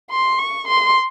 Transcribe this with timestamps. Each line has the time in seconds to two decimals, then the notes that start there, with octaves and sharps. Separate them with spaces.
0.10 C6
0.39 C#6
0.68 C6